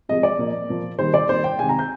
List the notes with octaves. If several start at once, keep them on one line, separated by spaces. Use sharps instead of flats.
C3 F3 G#3 D#5
D5
A#2 F3 A#3
A#2 F3 A#3
D#3 G3 A#3 C5
D5
D#3 G3 A#3 C5
G5
C3 D#3 G#3 G#5
A#5
G6